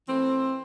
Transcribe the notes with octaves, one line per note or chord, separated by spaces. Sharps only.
E3 A3 C4